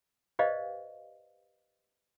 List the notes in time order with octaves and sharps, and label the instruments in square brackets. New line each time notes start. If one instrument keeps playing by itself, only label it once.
[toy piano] G4 B4 C5 D5 D#5 F5